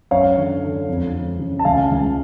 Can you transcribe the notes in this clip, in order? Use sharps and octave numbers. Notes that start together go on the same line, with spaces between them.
F#2 C#5 F5
D3
D3
F2
F2
C#3
A5
C#2 F5 G#5
C#2